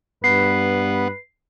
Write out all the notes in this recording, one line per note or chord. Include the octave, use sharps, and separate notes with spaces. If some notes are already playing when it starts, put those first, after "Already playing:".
G2 B3 B4 C7